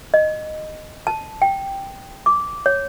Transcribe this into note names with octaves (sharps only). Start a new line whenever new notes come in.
D#5
A5
G5
D6
C#5